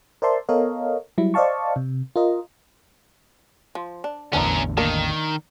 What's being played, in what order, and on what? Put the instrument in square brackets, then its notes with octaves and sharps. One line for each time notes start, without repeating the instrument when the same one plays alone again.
[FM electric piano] A#4 C5 D5 E5 A5 C6
B3 A4 A#4 C#5 D#5 F5
F#3 G3 E4
C5 D5 D#5 F5 A5 C#6
C3
F4 A#4 D#5
[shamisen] F3
D4
[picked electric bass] A1 E2 D3 [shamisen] B3 D4 E4 [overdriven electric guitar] C#4 A#4
[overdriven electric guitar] D#3 [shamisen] A#3 D4 A#4